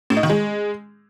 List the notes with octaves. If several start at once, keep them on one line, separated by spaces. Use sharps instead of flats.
A2
D#4
D#3
G#3